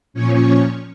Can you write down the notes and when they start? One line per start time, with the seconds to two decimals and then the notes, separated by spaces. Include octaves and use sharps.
0.14 A#2 F3 C#4 C#5